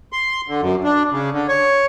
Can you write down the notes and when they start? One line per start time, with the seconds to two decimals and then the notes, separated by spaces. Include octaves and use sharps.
0.13 C6
0.48 D3
0.61 F#2
0.84 D4
1.12 C#3
1.33 D3
1.48 C#5